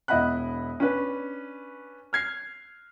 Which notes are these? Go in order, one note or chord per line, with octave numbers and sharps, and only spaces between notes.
E1 E4 D#5 F#5 B5 F#6
C#4 D4 B4
F6 G#6 C7